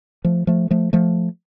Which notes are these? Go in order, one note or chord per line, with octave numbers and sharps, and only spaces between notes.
F3 A3
F3 A3
F3 A3
F3 A3